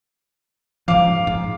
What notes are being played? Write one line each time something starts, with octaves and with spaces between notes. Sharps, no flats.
G#2 F3 F5 D6
G#2